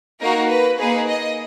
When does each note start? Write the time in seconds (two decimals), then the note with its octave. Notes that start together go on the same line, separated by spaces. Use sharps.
0.21 A#3 D#4 F#4 A#4
0.49 B4
0.78 A#3 D#4 G#4 B4
1.07 D#5